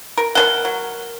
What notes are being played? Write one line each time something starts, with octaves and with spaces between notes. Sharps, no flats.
A#4
B2 D4 A#4 F#5
F#3